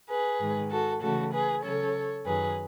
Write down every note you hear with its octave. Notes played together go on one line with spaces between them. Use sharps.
G#4 B4
G#2 D#3 G#3
F#4 A4
C#3 E3 A3 F#4 A4
G#4 B4
C#3 F#3 C#4 A4 C#5
F#2 D#3 F#3 G#4 B4